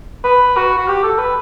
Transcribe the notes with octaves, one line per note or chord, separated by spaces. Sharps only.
B4
F#4
F#4
G4
A4
B4